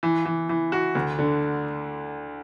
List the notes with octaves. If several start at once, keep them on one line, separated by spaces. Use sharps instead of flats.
E3
E3
E3
F#4
D2
D3